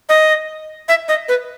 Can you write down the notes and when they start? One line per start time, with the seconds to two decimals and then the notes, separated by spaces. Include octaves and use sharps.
0.09 D#5
0.88 E5
1.08 D#5
1.29 B4